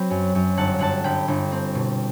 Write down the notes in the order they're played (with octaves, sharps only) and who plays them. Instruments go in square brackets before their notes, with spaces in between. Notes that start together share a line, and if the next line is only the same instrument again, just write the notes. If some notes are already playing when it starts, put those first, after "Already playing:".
Already playing: [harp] F#3 C4 B5
F#2
F#2
G1 F#5 A5
G1 F#5 A5
G1 G5 B5
G1
C4
B2